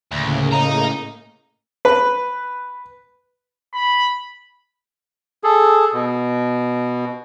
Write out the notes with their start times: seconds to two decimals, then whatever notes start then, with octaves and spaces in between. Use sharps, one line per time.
0.11 D2 A2 C#3 A#3
0.52 D#5 A#5
1.85 B4
3.74 B5
5.44 G#4 A4
5.93 B2